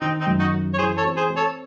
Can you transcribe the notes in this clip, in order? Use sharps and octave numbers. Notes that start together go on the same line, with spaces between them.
D#3 C4 D#4
C4 D#4
F#2
D#4 F#4
C#4
C#5
E3 G#4 C5
A4 C#5
C4
G#4 C5
C4
A4 C#5